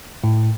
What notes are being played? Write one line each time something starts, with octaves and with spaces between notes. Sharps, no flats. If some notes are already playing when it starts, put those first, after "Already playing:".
A2